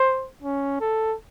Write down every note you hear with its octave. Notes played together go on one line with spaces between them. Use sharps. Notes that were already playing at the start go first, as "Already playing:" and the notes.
Already playing: C5
C#4
A4